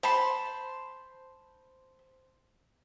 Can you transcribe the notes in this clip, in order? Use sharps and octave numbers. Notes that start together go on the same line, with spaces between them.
C5 A5 B5 C6